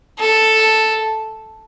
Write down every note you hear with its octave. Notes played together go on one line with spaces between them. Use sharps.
A4